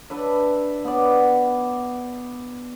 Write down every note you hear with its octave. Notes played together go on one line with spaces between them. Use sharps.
D4 B4 E5
B3 D5